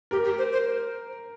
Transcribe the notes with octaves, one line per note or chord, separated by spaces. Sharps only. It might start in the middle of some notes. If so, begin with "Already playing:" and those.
G4 A#4
G4
C5
C5